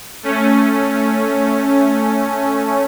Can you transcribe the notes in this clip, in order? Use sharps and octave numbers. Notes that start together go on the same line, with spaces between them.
A3 C#4